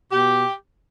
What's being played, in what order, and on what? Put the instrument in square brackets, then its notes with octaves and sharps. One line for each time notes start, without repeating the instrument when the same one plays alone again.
[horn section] B2 G4